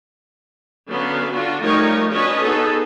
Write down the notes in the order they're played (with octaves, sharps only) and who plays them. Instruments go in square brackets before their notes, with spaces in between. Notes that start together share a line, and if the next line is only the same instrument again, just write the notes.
[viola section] D3 F#3 B3 C#4 F5
D3 D4 F4 F#4
F3 G3 A3 D#4 A#4 C#5
C#4 D4 F#4 B4 C#5 D#5
B3 D#4 G#4 A4